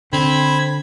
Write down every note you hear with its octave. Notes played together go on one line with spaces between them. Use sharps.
D3 C4 B5 G#6